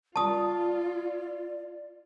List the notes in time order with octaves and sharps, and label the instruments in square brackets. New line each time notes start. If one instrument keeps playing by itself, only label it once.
[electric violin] F4 [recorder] D5 [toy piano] A5 D#6